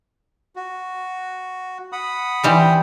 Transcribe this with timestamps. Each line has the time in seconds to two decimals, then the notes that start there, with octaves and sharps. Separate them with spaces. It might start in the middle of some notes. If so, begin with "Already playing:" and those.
0.56 F#4
1.92 F#5 B5 D#6
2.43 E3 G3 C4